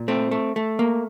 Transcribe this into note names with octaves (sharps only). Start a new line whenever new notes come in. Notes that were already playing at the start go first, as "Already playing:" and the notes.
Already playing: A#2
A3 C4
A3
A3
A#3